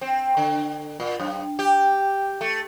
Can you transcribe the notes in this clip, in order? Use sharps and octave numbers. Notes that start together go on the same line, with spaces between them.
C4
D3
A#2
F#2
G4
A3